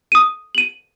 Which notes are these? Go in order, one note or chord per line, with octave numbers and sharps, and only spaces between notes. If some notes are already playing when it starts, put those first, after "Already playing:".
D#6 D#7
D#7 F#7